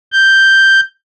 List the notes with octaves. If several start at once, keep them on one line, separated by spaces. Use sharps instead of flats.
G6